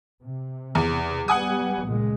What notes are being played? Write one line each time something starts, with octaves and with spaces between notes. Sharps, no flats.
C3
E2
G3 B3 F#5 G#5 D#6
C#2 A#2 G#3